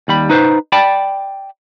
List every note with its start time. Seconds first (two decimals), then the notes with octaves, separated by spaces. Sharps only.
0.08 D#2 G3 B5
0.30 D#4 B4 C5
0.72 D5 G5 A5 B5